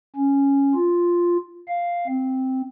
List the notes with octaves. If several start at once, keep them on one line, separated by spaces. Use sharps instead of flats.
C#4
F4
F5
C4